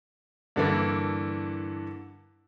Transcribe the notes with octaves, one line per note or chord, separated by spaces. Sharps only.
G2 D3 E3 A#3 E4